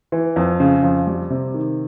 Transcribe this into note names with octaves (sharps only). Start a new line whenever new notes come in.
E3
F2
C#3
F2
G3
C3
D#3